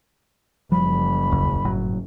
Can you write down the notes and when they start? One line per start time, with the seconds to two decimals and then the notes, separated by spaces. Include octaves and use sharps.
0.72 F#1 F3 G3 B5
1.31 D#1 C#2
1.65 G1 A2 F#3